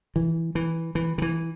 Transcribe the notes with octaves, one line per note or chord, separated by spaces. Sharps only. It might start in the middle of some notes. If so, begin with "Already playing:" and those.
E3
E3
E3
D#3
E3